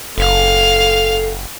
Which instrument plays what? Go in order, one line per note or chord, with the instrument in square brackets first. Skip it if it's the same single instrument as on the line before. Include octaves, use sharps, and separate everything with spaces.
[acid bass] F#1 [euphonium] A4 [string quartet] F5